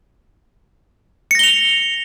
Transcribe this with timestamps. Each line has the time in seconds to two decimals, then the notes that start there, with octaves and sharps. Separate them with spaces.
1.31 C#7
1.35 A#6
1.39 G7
1.43 F7